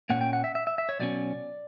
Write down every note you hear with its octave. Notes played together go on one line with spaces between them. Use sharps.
A#2 A#3 C#4 F#5
G5
F#5
E5
E5
E5
E5
C#5
B1 B2 F#3 C#4 D5